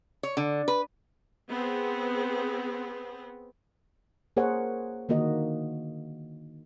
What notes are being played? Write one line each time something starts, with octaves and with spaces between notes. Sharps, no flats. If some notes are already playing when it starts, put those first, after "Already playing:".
C#5
D3
B4
B3 C4 G#4
A#3 G#4 A#4 C5 C#5 F#5
D3 D#3 A#3 F#4 D#5